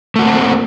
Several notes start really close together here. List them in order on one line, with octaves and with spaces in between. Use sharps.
A3 F#4 A#3 C4